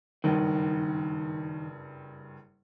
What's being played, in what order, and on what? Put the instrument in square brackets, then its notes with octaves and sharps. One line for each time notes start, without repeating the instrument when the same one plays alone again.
[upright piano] F#1 G2 [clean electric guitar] D#3